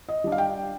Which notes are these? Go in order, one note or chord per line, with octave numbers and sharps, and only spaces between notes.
D#5
G3 D4
F5
G5